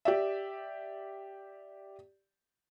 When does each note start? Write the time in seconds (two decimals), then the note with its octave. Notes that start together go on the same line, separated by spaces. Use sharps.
0.05 G4 D5 E5